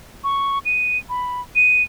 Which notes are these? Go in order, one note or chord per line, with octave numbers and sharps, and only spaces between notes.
C#6
D#7
B5
D#7